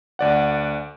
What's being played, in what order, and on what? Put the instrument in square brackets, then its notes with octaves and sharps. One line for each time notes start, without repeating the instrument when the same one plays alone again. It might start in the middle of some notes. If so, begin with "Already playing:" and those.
[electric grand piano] D2 D5 F#5